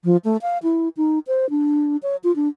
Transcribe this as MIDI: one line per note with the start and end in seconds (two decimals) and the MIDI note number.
0.04 0.17 53
0.25 0.37 57
0.42 0.58 77
0.63 0.89 64
0.97 1.19 63
1.27 1.49 72
1.50 1.97 62
2.03 2.16 73
2.24 2.34 65
2.36 2.48 62